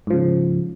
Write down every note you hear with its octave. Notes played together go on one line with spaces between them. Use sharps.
G#2 C#3 F3